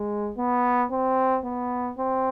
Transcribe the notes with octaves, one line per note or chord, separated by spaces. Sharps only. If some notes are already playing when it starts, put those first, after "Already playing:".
Already playing: G#3
B3
C4
B3
C4